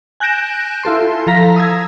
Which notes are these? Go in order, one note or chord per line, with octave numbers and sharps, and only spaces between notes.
G#5 F#6 G6 A#6 D7 E7
E4 F4 A4 C6
F3 A4 F5 A#5 A#6 B6
D#6 E6 G#6